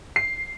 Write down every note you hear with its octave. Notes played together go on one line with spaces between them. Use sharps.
C7